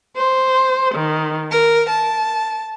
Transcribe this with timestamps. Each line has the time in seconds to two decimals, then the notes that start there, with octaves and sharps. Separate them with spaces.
0.16 C5
0.94 D#3
1.50 A#4
1.90 A5